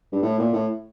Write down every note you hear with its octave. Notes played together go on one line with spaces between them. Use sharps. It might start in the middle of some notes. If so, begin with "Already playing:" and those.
G2
A2
A#2
A2